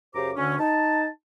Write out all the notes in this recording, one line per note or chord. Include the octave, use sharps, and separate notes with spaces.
F#2 C#3 G4 C5 A#5 D6
D2 D3 C#4
D#4 A5